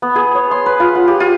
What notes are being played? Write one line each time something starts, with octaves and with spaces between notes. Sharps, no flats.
B3
G#4
C#5
C6
B4
F4
F#5
G4
F4